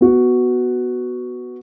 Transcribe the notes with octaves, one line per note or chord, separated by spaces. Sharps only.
B3 F#4